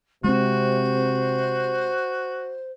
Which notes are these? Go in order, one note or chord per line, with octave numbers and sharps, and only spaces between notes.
C3 G#3 C4 F#4 C5